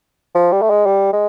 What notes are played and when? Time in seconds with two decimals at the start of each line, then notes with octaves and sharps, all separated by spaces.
0.35 F3
0.52 G3
0.62 A3
0.70 G#3
0.86 G3
1.13 G#3